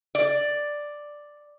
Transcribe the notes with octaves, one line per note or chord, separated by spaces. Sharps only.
D5